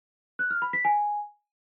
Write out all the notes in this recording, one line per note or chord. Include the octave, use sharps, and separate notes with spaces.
F#6
F6
B5
B6
G#5